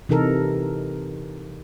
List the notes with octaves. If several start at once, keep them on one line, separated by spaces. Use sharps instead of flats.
C3 E3 D#4 A4 A#4